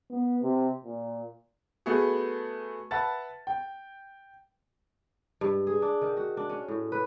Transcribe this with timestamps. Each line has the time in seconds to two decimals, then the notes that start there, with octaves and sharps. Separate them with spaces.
0.10 B3
0.42 C3
0.84 A#2
1.86 A3 B3 F#4 G#4
2.91 B4 E5 F#5 A5 A6
3.47 G5
5.41 G2
5.67 G#4
5.82 D4
6.01 D#3
6.17 F#4
6.37 D4
6.49 C#4
6.68 A2
6.92 B4